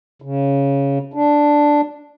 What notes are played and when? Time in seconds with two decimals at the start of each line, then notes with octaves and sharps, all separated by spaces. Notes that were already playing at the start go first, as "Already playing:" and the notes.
0.22 C#3
1.14 D4